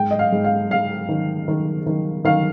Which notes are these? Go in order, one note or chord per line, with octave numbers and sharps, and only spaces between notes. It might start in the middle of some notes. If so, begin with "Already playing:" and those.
Already playing: G#2 G5
D#5
F5
G#2
F5
G#2 F5
D#3
D#3
D#3
D#3 F5